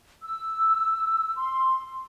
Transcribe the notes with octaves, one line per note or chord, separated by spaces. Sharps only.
E6
C6